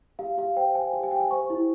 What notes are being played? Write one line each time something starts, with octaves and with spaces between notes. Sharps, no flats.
G4 F5
G4 F5
C5 G5
C5 G#5
G4
G#5
G4 G5
G#5
C5 C#6
E4